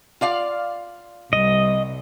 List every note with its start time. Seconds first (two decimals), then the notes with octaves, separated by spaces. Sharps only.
0.21 F4 D5 F5
1.33 C2 D#5